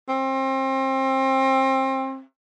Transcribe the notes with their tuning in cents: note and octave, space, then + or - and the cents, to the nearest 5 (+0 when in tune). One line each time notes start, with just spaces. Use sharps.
C4 +30